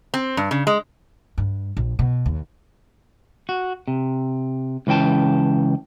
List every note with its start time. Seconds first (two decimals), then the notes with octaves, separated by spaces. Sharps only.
0.14 C4
0.37 G2
0.51 C#3
0.67 G#3
1.38 G2
1.77 A#1
1.99 B2
2.26 D#2
3.49 F#4
3.88 C3
4.87 C#2 E3 C#4 G5 A5